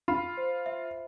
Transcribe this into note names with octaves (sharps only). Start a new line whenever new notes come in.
F4 B5
C5
E5